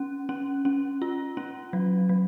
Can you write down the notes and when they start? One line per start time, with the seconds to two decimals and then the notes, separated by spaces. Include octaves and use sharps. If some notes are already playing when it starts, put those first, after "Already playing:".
Already playing: C#4
0.29 C#4
0.65 C#4
1.02 F4
1.37 C#4
1.73 F#3
2.09 F#3